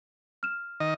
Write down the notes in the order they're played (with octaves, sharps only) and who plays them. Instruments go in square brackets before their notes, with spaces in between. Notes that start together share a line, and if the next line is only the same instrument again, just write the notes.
[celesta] F6 E7
[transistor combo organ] D#3 D#5